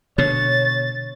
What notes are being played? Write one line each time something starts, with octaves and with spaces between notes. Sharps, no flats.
B2 D3 C#5 A6